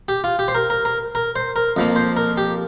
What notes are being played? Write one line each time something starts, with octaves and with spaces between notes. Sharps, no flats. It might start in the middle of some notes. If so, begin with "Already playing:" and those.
G4
F4
G4
C5
A#4
A#4
A#4
A#4
C5
A#4
F2 F3 A#3
C5
A#4
G4